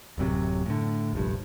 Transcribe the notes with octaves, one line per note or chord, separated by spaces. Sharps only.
D1 F#2 C3 F#3
A2 D3
F1 A#1 G2